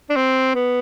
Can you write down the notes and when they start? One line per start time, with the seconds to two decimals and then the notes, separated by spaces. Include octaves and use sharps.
0.10 D4
0.16 C4
0.55 B3